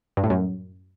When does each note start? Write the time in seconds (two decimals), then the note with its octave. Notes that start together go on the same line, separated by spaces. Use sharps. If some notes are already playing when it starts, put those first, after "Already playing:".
0.17 G2
0.24 A2
0.30 F#2